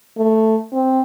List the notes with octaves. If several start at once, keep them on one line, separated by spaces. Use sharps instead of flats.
A3
C4